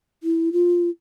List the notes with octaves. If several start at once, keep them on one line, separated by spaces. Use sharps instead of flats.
E4
F4